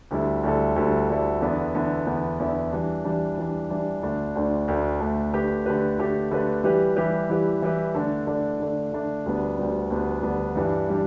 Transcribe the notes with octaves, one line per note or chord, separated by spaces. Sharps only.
D2 D3 G3 E4 A4
D2 D3 G3 E4 A4
D2 D3 G3 E4 A4
D2 D3 G3 E4 A4
E2 D3 B3 E4
E2 D3 B3 E4
E2 D3 B3 E4
E2 D3 B3 E4
E3 G3 D4
E3 G3 D4
E3 G3 D4
E3 G3 D4
D2 D3 A3 D4
D2 D3 A3 D4
D2 D3 A3 D4
D2 D3 A3 D4
D3 A3 G4 B4
D3 A3 G4 B4
D3 A3 G4 B4
D3 A3 G4 B4
E3 G3 E4 G4 B4
E3 G3 E4 G4 B4
E3 G3 E4 G4 B4
E3 G3 E4 G4 B4
D3 A3 D4
D3 A3 D4
D3 A3 D4
D3 A3 D4
D2 D3 G3 B3 D4
D2 D3 G3 B3 D4
D2 D3 G3 B3 D4
D2 D3 G3 B3 D4
G2 E3 G3 D4 B4
E3 G3 D4